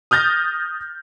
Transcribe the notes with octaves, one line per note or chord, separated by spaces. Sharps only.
D#6 F6 G6 A6 A#6